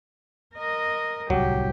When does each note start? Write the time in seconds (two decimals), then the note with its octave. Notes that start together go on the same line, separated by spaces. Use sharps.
0.55 A#4 D#5
1.30 D1 C2 F#3 G3 G4